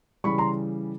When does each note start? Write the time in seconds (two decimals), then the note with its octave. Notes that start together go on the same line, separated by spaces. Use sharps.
0.24 C#3 E3 G3 B5 C#6
0.38 A#5 C6